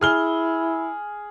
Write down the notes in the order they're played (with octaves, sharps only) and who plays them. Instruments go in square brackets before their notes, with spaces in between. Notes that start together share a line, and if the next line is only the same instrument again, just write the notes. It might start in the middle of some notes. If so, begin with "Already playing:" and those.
[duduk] E4 [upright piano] G#4 F6 G7